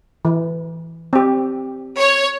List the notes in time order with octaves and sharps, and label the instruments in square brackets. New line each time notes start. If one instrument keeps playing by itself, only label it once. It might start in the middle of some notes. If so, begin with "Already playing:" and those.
[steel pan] E3
C4 G4
[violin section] C#5